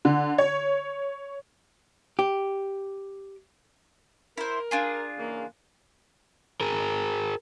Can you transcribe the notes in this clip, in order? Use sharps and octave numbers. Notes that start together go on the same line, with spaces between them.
D3
C#5
G4
E4 A#4 C5
D4 F4 G#4
C#3 E3 A#3
G#4 A#4